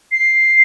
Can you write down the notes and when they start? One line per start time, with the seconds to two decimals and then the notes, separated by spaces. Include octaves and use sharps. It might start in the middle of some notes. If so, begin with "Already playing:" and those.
0.12 C7